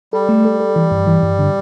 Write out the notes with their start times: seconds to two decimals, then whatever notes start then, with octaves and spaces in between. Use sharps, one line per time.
0.13 G3 A4
0.29 A3
0.45 A4
0.60 A4
0.76 E3
0.92 G2
1.07 E3
1.23 G2
1.39 D3